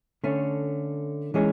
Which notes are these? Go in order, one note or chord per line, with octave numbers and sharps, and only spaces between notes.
D3 A3 C#4
E3 G#3 C#4 G#4 C#5